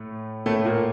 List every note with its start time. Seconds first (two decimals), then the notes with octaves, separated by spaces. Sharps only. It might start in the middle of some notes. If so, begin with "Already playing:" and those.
Already playing: A2 A3
0.46 A2 A3
0.65 A#2 A#3